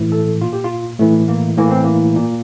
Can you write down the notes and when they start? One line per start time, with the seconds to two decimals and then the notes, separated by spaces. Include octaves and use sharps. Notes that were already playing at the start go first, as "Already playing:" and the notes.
Already playing: A2 E3
0.12 A4
0.41 A#2 F4
0.53 G4
0.64 F4
0.99 A2 E3 A3
1.28 A#3
1.57 A2 E3 A#3
1.70 C4
1.83 A#3
2.16 A#2